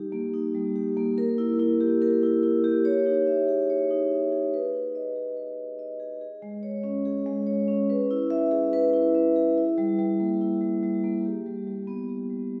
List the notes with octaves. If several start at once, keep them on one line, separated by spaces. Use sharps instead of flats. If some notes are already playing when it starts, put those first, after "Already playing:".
Already playing: G3 D#4 G4
A#3
D#4
G3
G4
A#3
A#4
E4
E4
G4
A#4
E4
E4
G4
C#5
D#4
E5
G#4
C#5
D#4
E5
G#4
B4
D#4
D#5
G#4
B4
D#4
D#5
G#4
G#4
G#3
C#5
C#4
G#4
G#3
C#5
C#4
B4
E4
E5
G#4
B4
E4
E5
G#4
E4
G3
G3
A#3
E4
G3
G3
A#3
G4
G3
G3
B3
G4
G3